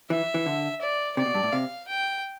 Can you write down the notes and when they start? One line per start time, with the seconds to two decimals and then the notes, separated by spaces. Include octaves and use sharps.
0.10 E3 E5
0.34 E3
0.46 D3
0.81 D5
1.17 C3 D5
1.26 B2
1.34 G2
1.43 A2
1.52 C3 F5
1.88 G5